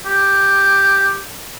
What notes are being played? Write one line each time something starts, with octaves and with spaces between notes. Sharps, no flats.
G4